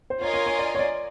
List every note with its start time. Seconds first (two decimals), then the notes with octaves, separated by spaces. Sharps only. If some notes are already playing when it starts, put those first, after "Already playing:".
0.10 C5
0.21 F4 A#4 C#5 D#5 G#5
0.34 C#5
0.46 C#5
0.59 D5
0.75 C#5
0.79 D5